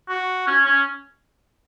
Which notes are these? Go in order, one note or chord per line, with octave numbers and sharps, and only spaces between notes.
F#4
C#4
C#4